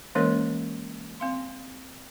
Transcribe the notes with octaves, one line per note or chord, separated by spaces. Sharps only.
E3 G#3 A#3 C#4 A#4 C#5
C4 F5 C6